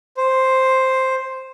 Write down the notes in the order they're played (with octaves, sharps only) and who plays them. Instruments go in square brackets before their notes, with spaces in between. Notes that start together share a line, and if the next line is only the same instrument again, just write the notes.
[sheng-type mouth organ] C5